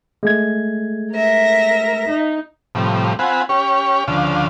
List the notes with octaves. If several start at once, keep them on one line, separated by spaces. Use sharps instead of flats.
G#3 A3 G#6
A#4 E5 A#6
D#4
A2 C3 F3 G3
C4 F4 F#5 G#5 B5
C#4 G4 C#5
D2 C#3 F3 D4 F5